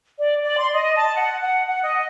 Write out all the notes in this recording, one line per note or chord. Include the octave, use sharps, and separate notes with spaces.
D5
D5
C6
D#5
A5
F#5
F#5
F#5
D#5